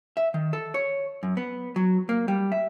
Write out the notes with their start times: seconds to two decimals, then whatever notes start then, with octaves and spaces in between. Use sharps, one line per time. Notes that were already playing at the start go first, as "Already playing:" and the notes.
0.17 E5
0.34 D#3
0.53 A4
0.74 C#5
1.23 F#2
1.37 B3
1.76 F#3
2.09 A#3
2.28 G3
2.52 E5